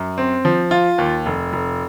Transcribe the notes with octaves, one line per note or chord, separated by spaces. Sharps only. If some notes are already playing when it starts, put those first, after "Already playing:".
Already playing: F#2
C4
F3
F4
D#2
F1
F1